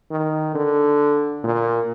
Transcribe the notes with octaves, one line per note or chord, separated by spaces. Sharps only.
D#3
D3
A#2